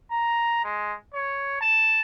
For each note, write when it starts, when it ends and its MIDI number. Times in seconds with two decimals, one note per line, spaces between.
0.11 0.64 82
0.64 0.94 56
1.14 1.58 73
1.61 2.01 81